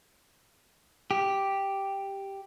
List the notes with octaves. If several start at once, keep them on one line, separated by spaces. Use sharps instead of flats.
G4